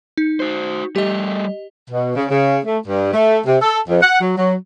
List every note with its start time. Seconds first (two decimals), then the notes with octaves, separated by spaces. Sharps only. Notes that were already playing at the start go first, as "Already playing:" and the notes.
0.17 D#4
0.40 F#4 C5
0.96 G3 A3 G4 D#5
1.89 B2
2.15 C#3
2.29 C#3
2.65 A3
2.87 G2
3.13 A3
3.45 C3
3.61 A4
3.88 F2
4.01 F#5
4.20 F#3
4.36 F#3